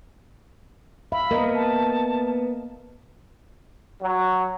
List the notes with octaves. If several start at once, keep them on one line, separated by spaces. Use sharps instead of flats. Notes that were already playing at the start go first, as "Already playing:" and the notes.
E5 F5 B5
A#3 B3 A#4 D#5
A5
F#3